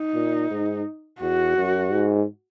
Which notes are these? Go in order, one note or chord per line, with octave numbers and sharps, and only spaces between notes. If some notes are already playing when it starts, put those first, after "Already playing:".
Already playing: D#4
A#2
G#2
E2 F#4
F#2
G#2